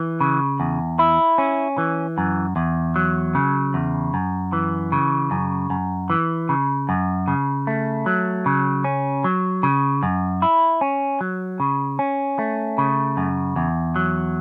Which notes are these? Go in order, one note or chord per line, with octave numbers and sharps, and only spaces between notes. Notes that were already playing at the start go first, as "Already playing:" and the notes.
Already playing: E3
C#3
E2
E4
C#4
E3
F#2
E2
F#3
C#3
E2
F#2
E3
C#3
F#2
F#2
E3
C#3
F#2
C#3
A3
F#3
C#3
C#4
F#3
C#3
F#2
E4
C#4
F#3
C#3
C#4
A3
C#3
F#2
E2
F#3